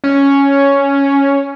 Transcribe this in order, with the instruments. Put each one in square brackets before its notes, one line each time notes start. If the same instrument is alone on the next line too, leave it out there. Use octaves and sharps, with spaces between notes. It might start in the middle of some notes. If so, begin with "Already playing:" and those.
[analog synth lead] C#4